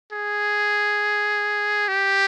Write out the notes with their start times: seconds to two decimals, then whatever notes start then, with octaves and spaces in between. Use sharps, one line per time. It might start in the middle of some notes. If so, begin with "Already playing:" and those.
0.13 G#4
1.88 G4